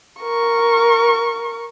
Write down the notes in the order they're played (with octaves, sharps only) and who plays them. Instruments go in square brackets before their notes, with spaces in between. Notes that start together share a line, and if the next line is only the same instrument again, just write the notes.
[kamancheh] A#4 C#6